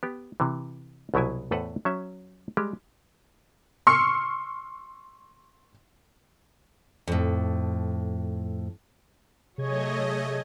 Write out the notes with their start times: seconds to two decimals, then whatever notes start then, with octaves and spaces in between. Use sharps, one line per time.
0.03 B3 G4
0.40 C3 E3
1.14 C2 B2 F#3 E4 G#5
1.51 E2 A2 A4 B4 C5 F#5
1.85 F#3 C#4 E5
2.57 G3 G#3 G4
3.87 C6 C#6 E6 F6 C7 C#7
7.08 F2 A2
9.58 C3 F#3 A3 G#4 C#5 D#5 G#6